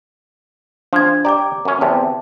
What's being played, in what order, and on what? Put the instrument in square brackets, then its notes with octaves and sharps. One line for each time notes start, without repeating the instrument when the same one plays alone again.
[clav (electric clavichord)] F3 [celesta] D4 G#6
[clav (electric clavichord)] G4 D5 [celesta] A#5 D6
[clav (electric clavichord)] F#2 C#4
[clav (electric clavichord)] E2 C3 [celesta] A5